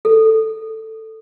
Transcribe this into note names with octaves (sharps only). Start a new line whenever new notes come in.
A4